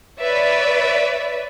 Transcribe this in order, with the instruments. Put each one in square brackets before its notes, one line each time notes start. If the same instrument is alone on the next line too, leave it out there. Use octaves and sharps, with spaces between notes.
[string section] B4 C#5 D5 E5